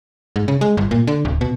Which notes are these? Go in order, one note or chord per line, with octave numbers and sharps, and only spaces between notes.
G#2
C#3
G#3
G1
A#2
D3
D1
B2